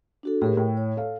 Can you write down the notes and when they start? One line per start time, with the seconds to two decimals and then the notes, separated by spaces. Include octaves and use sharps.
0.23 D4 F#4 A4
0.42 A2 G4 G#4 A#4
0.57 A2 G5
0.77 C#5
0.97 A4 F5